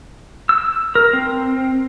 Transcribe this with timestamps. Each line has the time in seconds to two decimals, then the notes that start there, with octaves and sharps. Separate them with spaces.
0.49 E6
0.95 A#4
1.13 C4